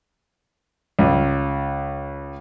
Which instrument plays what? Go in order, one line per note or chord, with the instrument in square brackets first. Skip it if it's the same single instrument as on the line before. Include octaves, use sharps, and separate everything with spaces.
[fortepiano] C#2